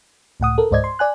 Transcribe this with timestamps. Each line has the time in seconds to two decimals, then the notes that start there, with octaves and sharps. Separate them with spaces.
0.40 C#2 A2 F#5 D#6
0.58 A4 A#4
0.71 C#2 G#2 C5 D5 D#5 G#6
0.84 C6
0.99 D5 G#5 F#6